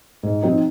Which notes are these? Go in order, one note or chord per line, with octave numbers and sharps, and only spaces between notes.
G#2
F3 C4 D#4